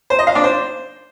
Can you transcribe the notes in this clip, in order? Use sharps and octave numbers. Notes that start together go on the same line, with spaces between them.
C5
D#5
F5
D4
C5